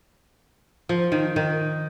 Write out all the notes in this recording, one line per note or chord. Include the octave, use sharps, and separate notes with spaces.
F3
D#3
D#3